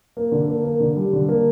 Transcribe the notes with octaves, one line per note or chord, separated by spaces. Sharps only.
A#3
D3
A#3
A#3
D3
G3
D3
A#3